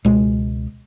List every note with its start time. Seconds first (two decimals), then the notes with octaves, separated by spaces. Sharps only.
0.05 C#2 B2 G#3